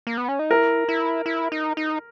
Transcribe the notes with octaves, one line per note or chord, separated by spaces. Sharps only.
A#3
B3
C#4
D#4
E4 A#4
E4
E4
D#4
D#4